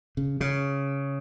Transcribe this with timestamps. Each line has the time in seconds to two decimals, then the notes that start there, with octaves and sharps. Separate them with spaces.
0.17 C#3
0.41 C#3